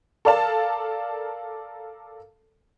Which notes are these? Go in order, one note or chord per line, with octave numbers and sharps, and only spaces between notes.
A4 A#4 D5 F5 A5